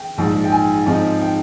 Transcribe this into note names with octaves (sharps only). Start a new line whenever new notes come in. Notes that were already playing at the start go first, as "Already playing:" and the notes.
Already playing: G5
A#1 G#2 F3
G5
G#5
G#2 F3 C4 D#4
G5